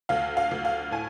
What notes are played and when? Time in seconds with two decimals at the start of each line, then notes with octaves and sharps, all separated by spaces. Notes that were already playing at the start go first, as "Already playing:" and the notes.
0.09 D2 F5
0.37 F5
0.51 D2
0.65 F5
0.91 A2 G#5